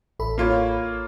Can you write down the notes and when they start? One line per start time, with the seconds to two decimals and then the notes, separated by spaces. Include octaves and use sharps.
0.19 A1 A4 B5
0.38 A#3 F4 C#5